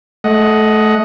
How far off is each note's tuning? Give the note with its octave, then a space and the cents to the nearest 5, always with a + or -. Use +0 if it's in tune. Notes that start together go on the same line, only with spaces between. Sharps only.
A3 -20 D#5 +10 F#5 +0